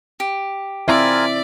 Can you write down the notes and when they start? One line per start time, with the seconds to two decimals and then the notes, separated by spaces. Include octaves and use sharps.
0.20 G4
0.88 C4 E4 F4 A#4 D5 E5 G#5